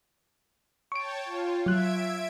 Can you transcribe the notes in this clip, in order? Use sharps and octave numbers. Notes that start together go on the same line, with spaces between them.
C#5 G5 A5 C#6 D7
F4
F#3 E5 F#6 G#6 D7